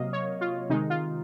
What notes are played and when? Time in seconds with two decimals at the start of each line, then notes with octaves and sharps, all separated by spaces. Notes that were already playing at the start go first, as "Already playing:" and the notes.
Already playing: C3 F#3 A#3 D#5 F5
0.13 C#5
0.41 F4
0.70 C3 D#3 G#3 D#4
0.90 F4